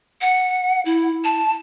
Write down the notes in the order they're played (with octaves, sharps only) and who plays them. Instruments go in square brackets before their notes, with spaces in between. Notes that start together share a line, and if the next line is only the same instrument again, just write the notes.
[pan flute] F#5
E4
A5